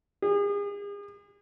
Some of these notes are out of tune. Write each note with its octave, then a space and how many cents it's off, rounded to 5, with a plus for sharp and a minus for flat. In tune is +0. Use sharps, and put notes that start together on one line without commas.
G#4 -40